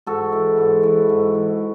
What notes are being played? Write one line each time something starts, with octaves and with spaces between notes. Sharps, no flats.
G#2 F#4 A4
E3
G#2
E3
G#2
E3